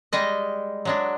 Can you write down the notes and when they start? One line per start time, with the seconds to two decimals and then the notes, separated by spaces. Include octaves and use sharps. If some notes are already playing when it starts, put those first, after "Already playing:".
0.13 G3 G#3 D#5
0.85 F#3 G#3 D4